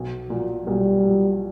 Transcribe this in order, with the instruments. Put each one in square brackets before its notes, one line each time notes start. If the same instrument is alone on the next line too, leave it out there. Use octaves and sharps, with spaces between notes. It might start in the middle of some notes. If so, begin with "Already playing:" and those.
Already playing: [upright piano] B1
A#2 F#3
[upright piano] B1 [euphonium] G3
[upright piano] A#2 F#3